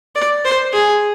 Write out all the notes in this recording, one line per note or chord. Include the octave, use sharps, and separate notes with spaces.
D5
C5
G#4